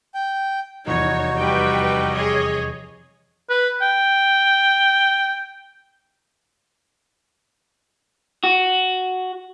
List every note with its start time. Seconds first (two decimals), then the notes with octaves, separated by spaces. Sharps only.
0.14 G5
0.87 F1 E2 D#4 F#4 C#5
1.37 G3 B4 G5
2.10 G#4 C#5 D#5
3.50 B4
3.82 G5
8.44 F#4